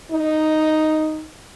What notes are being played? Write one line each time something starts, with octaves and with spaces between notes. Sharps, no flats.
D#4